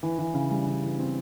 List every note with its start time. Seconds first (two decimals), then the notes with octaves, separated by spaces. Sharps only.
0.03 E3
0.18 E3
0.34 C#3
0.51 G3
0.66 C#3
0.83 E3
0.99 C4